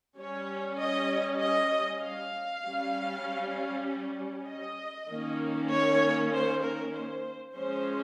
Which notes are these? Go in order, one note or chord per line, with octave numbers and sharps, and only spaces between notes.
G3 C#4 C#5
D#5
D#5
F5
G3 C#4
D#5
D#3 A#3 C#4
C#5
C5
A#4
C5
F3 G#3 C#4 C5